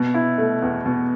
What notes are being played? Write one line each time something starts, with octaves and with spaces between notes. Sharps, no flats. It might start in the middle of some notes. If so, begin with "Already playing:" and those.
Already playing: B2
E4
A3
E2
B2